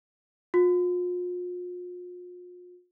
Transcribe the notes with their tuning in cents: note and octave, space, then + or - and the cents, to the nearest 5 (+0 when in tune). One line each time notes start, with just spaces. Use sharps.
F4 +40